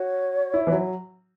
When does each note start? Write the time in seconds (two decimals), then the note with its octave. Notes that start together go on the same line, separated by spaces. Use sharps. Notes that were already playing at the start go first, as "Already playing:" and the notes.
Already playing: F#4 C#5
0.54 E4
0.67 E3
0.72 F#3